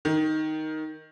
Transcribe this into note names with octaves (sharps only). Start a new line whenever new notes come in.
D#3